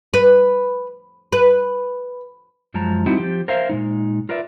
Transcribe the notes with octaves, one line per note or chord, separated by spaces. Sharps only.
B4
B4
F#2 F3 G#3 A5 A#5
G3 C4 D#4 E4 F#4
F3 G4
A#4 C5 E5 F5
A#2 G#3 D#4
F4 A#4 B4 D5 E5